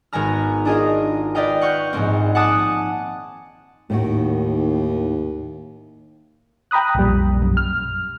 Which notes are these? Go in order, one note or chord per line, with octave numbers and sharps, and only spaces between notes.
G#1 B3 G#5 A#5 F6
D4 F4 G#4 A#4 D#5 F5
B4 D5 D#5 F5 G5
F#5 C#6 F6 G6
A#1 G#2 A#3 C4
F#5 G#5 A5 D6 D#6 F#6
D#2 A2 D#3 F#4
G5 A#5 B5 D#6 F#6
B1 F2 A#2 G3
B1 F#2
F6